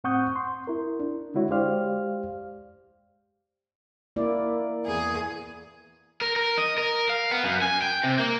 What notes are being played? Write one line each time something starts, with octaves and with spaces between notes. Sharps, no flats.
A2 C4 F#5 C#6 D#6 G6
C6
E4 A#4
D4
D3 G#3 D4 E4 F#4 C#5
G#3 G4 C5 D5 F5 F6
A#3 E4 D5
E2 G#4
A#4
A#4
D#5
A#4
F5
B3
F#2
G#5
G5
C3
A#3